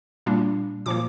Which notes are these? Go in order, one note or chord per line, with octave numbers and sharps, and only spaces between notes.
A#2 G3 A#3 D4
A#2 F3 A#3 D6